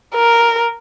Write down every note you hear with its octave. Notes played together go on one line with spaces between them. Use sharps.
A#4